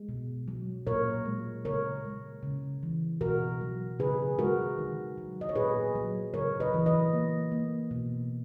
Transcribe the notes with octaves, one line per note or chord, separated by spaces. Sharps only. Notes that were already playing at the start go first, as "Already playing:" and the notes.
Already playing: G#3
B2
F#3
A#2 A#4 C#5
G#3
C#3 A#4 C#5
G#3
C#3
E3
B2 F#4 A#4
F#3
C#3 G#4 B4
G#3 F#4 A#4
D#3
F#3
D#5
C#5
A#2 G#4 B4
F#3
C#3 A#4 C#5
B4 D#5
E3
B4 D#5
A#3
A#3
B2